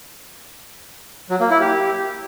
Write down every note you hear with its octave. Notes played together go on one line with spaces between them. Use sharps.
F#3
A#3
E4
G4